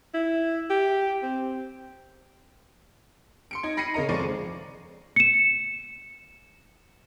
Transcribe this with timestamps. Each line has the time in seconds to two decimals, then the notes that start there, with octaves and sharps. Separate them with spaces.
0.14 E4
0.70 G4
1.22 C4
3.51 C6 C#7 D7
3.63 D#4 G#6
3.77 B5 A#6 C7 C#7 D#7
3.94 C#3 A#4 D#5 A#5
4.09 F1 F3 G#3 D5 C#6 D#7
5.16 C#7 E7